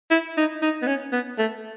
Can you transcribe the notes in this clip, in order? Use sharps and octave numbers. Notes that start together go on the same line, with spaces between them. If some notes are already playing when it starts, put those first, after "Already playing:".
E4
D#4
D#4
B3
C#4
B3
A3